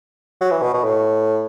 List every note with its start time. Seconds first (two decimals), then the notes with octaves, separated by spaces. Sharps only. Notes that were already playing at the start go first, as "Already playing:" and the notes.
0.41 F#3
0.51 E3
0.62 B2
0.74 B2
0.84 A2